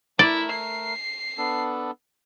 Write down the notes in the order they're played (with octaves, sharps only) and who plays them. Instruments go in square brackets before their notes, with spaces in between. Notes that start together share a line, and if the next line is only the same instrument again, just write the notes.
[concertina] A3 A#4 [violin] E4 [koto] D5
[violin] C7
[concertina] B3 D4 A4